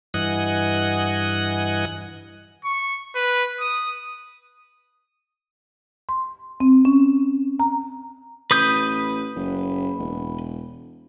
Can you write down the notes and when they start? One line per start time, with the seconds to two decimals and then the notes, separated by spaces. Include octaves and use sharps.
0.14 G2 E3 D#5 F#5 G#5 F#6
2.65 C#6
3.15 B4
3.60 D#6
6.09 C6
6.60 C4
6.85 C#4
7.60 A#5
8.51 A1 B4 D#6 G6
9.36 F#1
9.99 E1